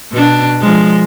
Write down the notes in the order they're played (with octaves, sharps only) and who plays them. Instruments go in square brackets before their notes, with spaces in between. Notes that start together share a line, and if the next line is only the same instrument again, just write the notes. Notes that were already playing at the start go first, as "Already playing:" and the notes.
[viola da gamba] B2 D4
F3 G#3